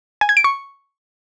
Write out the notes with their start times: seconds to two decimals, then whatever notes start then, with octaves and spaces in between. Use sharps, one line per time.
0.21 G#5
0.29 G#6
0.37 D7
0.44 C#6